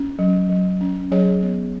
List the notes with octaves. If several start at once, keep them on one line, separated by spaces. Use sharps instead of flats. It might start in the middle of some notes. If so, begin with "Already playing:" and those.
Already playing: C#4
F#3
F#3
C#4
F#3 G#4 C#5
B3